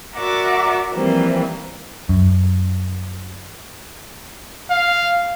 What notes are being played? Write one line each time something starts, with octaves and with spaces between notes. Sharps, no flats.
F#4 A#4 D5 E5 F#5 D6
E3 F3 G3 A#3 C4
F#2
F5